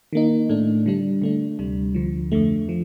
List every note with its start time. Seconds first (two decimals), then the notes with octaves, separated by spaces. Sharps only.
0.13 D#3 A#3 D#4
0.49 A2 A3 D4
0.86 D3 G3 D4
1.22 D3 A3 D4
1.59 D2 C3 G3
1.95 D2 D3 F3
2.32 F2 D3 A3
2.69 F3